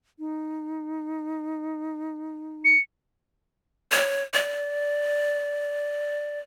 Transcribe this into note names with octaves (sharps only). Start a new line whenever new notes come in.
D#4
C#7
C#5
D5